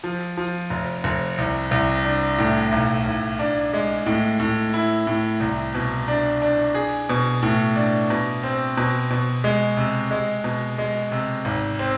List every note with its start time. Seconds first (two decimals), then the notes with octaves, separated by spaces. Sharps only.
0.04 F3
0.38 F3
0.70 F1
1.04 F1
1.38 C2
1.71 C2
2.05 D4
2.38 A2
2.72 B1
3.06 B1
3.39 D4
3.73 G#3
4.06 A2
4.40 A2
4.74 E4
5.07 A2
5.40 C2
5.74 B2
6.08 D4
6.42 D4
6.75 G#4
7.09 B2
7.43 A2
7.76 D4
8.10 B2
8.43 C4
8.77 B2
9.10 B2
9.44 G#3
9.77 C3
10.11 G#3
10.44 B2
10.78 G#3
11.11 C3
11.45 G#1
11.79 C4